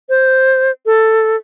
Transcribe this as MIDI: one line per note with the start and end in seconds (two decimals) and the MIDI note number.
0.09 0.71 72
0.86 1.36 69